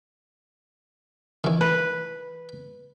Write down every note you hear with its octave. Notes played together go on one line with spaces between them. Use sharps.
D#3 E3
B4